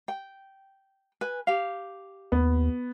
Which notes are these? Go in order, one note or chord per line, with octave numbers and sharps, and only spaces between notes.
G5
B4 G#5
G4 F5
D#2 B3